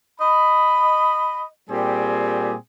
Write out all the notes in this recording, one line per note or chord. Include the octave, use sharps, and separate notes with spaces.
D#5 B5
A#2 G3 C4 G4 G#4